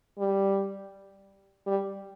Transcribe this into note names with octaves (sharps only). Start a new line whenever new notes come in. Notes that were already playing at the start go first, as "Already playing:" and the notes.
G3
G3